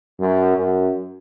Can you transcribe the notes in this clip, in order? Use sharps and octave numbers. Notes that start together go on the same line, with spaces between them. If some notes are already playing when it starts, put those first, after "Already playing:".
F#2
F#2